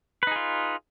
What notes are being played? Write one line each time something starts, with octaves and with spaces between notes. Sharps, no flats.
D#4 F4 G#4 B4